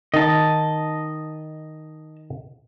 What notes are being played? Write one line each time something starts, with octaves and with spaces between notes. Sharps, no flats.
D#3 D#5 A5